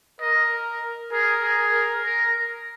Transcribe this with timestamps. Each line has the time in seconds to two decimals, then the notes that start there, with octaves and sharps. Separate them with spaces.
0.21 A#4 D#5
1.12 G#4 A#4
1.43 G#4
1.72 A#4
2.04 A#4